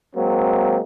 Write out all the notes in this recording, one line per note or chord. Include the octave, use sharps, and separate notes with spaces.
F#3 G#3 A#3 C4